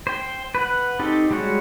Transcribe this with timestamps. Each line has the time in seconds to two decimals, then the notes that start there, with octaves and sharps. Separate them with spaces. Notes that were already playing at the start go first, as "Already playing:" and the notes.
0.07 C5 G5
0.55 B4 F#5
0.99 C4 D#4 G4 A4
1.31 G3 G#3 F#4 C#5